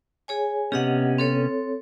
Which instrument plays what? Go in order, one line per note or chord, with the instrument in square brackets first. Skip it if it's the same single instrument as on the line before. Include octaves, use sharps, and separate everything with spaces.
[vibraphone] G#4 C#5 G#5
[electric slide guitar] C3 B3 C#4 [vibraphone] G4 D#5 F#5
[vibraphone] C4 A4 C#5